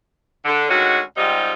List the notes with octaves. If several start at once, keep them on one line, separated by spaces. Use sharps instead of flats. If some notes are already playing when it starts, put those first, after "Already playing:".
D3
D2 D#3 G#3 C#4 F#4
G#2 C3 G3 D#4 F4